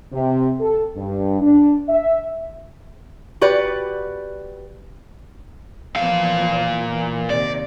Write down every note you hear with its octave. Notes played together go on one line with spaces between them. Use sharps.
C3
A4
G2
D4
E5
F#4 G4 B4 D5
A#2 E3 F3 B3 F5
E3
C3 D#3 A#3 D5